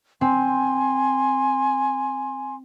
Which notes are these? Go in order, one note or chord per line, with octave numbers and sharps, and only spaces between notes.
C4 G#5 C6